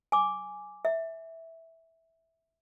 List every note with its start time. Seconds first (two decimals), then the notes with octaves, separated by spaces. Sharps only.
0.12 G#5 D6
0.85 E5